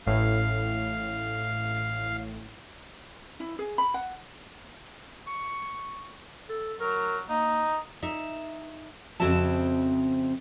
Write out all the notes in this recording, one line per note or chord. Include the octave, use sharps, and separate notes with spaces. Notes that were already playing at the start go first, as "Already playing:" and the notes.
A1 A2 F5
E4
G#4
B5
F#5
C#6
A4
F#3 A#4
A#3 D#4
D#4 E5
F2 C#3 C4 F#4 E5 A5